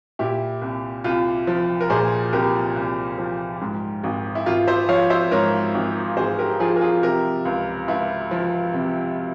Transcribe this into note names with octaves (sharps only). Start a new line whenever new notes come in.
A#2 E4 G4
C2
C2 F4
F3
A#4
A#2 G#4 C5
C2 G4 A#4
C2
F3
G#2
G#1
E4
G#1 F4
C5 E5
F3 C#5 F5
C5 E5
G#2 A#4 C#5
G#1
G#1 G#4 C5
G4 A#4
F3 F4 G#4
A#4
F4 G#4
C3 G4 A#4
C#2
C#2 E4
F3
C3